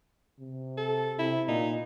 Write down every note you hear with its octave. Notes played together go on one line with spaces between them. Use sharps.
C3
A4
C3 E4
A#2 D#4